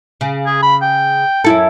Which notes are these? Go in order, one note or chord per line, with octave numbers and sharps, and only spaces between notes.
C#3
G#4
B5
G5
F#2 E4 A4